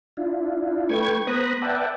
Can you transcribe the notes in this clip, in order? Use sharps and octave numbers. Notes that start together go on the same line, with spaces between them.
D4 E4 F4
A3 B4 G5 C#6 G#6
B3 C5 A#5 B5 D#6 F#6
B4 D5 E5 F#5 G5 A5